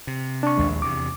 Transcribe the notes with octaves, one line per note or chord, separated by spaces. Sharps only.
C3
D4 C#6
A#1 D#2 G#3
E2 C3 D6